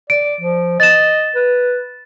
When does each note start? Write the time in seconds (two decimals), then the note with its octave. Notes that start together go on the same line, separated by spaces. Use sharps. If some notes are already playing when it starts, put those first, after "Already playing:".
0.10 D5 D7
0.41 F3
0.80 D#5 A6 E7
1.35 B4